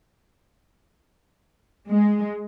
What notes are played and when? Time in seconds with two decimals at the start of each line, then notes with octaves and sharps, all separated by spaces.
1.89 G#3